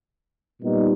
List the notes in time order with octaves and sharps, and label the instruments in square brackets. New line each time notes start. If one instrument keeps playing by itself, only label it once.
[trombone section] A#2 G3 B3 D#4